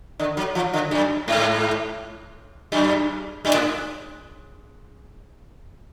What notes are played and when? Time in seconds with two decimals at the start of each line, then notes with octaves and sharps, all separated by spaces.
0.19 D3
0.37 F#3
0.55 F3
0.73 D3
0.91 F#2
1.28 G#2
2.72 F#2
3.45 F#2
3.53 A2